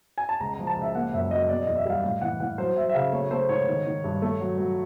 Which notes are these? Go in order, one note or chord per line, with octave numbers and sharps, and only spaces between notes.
G#5
A5
C#2 A#5
A#5
F3
A5
C#2
E5
A#3 F#5
F#2 E5
F#3 D#5
B2 D5
E2 D#5
E5
G3 F5
A2 F5
E3 F#5
E3 F#5
F#3 C5
F#3 E5
E5
C#3 F5
A3 C#5
A3 C5
G#2 C#5
D#3
D#3
G2
A3
F#3
F#3